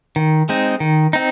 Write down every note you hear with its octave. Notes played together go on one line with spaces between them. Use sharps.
D#3
G#3 C4 D#4
D#3
C4 D#4